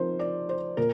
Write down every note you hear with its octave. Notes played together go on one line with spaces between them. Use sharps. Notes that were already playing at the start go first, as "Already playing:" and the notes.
Already playing: F3 C4 D#4 A#4 C5
D5
C5
A#2 A#4